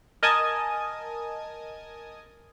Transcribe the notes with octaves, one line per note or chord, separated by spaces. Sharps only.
A#4 D#5 G#5 A5 D#6 G#6